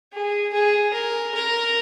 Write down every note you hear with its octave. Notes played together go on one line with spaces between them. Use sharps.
G#4
G#4
A#4
A#4